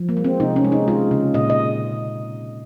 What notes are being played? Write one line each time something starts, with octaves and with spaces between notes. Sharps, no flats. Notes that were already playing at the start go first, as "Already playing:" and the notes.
Already playing: F3
A#3
G#3
C4
C3 D#4
C#4
G#3
D#4
G#3 F4
C#3
A#2 D#5
D#5